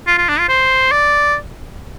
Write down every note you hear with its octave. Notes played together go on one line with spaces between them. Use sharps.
F4
F4
D4
F4
C5
D5